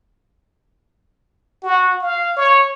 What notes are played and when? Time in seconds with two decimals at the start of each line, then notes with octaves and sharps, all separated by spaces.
1.63 F#4
2.01 F5
2.37 C#5